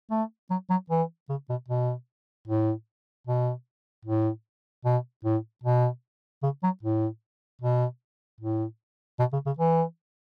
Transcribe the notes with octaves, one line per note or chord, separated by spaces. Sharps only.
A3
F#3
F#3
E3
C#3
B2
B2
A2
B2
A2
B2
A2
B2
C#3
F#3
A2
B2
A2
B2
C#3
C#3
E3